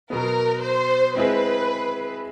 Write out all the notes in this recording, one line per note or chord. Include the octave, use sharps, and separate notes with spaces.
B2 F#3 B3 A#4
C5
G#3 C4 E4 G#4 B4